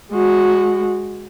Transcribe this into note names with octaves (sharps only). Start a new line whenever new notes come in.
G#3 F#4